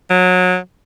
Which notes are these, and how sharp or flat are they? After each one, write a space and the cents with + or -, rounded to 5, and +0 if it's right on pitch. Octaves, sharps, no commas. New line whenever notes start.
F#3 -25